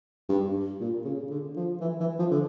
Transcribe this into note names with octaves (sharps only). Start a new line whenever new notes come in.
G2
A#2
C#3
D3
F3
E3
E3
F3
D3